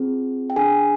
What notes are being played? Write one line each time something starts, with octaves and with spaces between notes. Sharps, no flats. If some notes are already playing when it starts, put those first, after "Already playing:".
Already playing: C4 F4 G#4
G5
D4 G#4 G#5